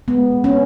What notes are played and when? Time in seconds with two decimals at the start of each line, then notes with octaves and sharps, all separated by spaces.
0.08 G#3 B3
0.32 B2
0.44 C#4